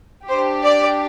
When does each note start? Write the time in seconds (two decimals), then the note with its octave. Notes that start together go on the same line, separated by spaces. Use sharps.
0.28 D4 G4 C5
0.63 D5